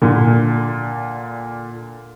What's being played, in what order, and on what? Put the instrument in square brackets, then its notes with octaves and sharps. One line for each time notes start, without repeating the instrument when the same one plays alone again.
[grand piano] A#2 D3